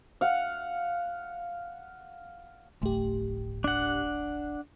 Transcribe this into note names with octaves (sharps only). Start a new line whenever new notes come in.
F5 F#5
D1 G1 A2 A3 G4
D4 F#5